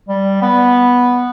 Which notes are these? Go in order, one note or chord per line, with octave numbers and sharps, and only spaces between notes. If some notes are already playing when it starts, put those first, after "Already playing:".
G3
B3